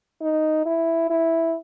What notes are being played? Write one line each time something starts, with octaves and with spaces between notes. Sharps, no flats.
D#4
E4
E4